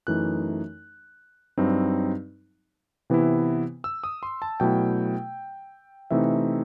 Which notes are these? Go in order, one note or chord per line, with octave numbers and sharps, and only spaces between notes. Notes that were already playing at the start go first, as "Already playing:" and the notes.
F#2 E3 A3 D#4 F#6
G2 F#3 C4 D#4
C3 E3 B3 E4
E6
D#6
C6
A5
B2 F#3 A3 E4 G5
C3 E3 A3 C4 D#4 E5